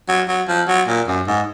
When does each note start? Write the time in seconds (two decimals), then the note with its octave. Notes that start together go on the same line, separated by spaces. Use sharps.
0.08 F#3
0.28 F#3
0.48 F3
0.68 F#3
0.87 A#2
1.07 F#2
1.27 G#2